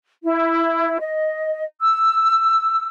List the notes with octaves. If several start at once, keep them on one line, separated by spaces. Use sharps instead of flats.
E4
D#5
E6